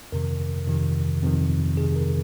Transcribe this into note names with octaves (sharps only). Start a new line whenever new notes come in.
F2 C3 D#3 A#4
F2 C3 D#3
F2 C3 D#3
F2 C3 D#3 G#4
A#4